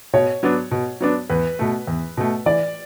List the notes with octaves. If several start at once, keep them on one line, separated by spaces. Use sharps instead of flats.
B2 C#5
F#3 B3 D4
B2
F#3 B3 D4
E2 B4
B2 A3
E2
B2 A3
E3 D5